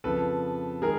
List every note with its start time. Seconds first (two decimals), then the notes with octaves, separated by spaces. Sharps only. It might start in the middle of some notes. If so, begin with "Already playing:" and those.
0.04 F2 C#3 F3 A4 B4
0.82 D#3 G#3 G#4 A#4